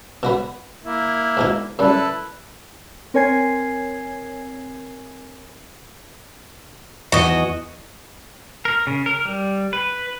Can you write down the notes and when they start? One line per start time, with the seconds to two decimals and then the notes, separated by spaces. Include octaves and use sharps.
0.23 B2 F#4 B4
0.85 A#3 E4
1.37 G#2 B2 D#4
1.79 F#2 G3 E4 A4 B4
3.14 C4 A#4 C#5 G#5 G#6 C7
7.12 E2 F#4 D#5
8.65 A#4
8.87 C#3
9.06 A#4
9.25 G3
9.73 B4